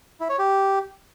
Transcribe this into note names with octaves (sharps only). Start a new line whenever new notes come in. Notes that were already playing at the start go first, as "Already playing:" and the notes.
E4
C#5
G4